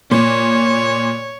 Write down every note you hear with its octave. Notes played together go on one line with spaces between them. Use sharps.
A#2 C#5